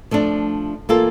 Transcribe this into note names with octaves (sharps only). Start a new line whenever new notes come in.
F3 A3 D4
E3 A#3 F4 A4